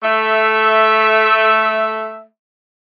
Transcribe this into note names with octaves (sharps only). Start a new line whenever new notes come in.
A3 E5